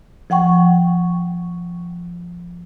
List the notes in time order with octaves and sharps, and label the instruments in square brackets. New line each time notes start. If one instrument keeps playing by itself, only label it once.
[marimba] F3 F#5 G5 C#6